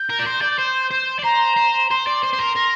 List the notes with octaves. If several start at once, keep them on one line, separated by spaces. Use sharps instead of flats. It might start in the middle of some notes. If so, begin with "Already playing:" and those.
Already playing: G6
A#4
D5
C5
D5
C5
C5
D5
C5 A#5
C5
C5 C6
D5
C5
C5
A#4
A#4